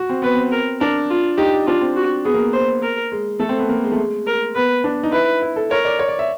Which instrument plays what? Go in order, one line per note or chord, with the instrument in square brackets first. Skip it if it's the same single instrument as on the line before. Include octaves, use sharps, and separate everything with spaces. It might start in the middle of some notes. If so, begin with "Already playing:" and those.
Already playing: [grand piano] F#4
C4
[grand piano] B3 [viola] B4
[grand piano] C4
[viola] A#4
[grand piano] D4 [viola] A#4
[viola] F4
[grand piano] D#4 [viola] G4
[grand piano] D4 [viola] F4
[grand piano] C4
[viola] F#4
[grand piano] B3 [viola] G#4
[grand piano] A#3
[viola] C5
A#4
[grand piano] G#3
[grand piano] A3 [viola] A4
[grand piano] C4
B3
A#3
G#3
A3
G#3
[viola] A#4
[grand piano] B3 [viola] B4
[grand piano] D4
D#4
[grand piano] E4 [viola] B4
[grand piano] E4
A4
[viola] A#4 [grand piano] C#5
[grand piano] D5
C#5
D5
E5